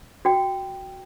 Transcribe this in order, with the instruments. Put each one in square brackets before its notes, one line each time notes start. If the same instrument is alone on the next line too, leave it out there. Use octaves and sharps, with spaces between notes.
[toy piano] F#4 G5